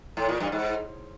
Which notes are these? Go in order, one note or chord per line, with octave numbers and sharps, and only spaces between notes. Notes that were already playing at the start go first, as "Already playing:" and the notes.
A2
A#2
G2
G#2